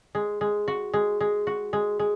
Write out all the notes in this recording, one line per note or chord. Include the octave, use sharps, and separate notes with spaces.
G#3
G#3
F#4
G#3
G#3
F#4
G#3
G#3